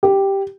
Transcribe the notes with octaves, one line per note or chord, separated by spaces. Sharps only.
G4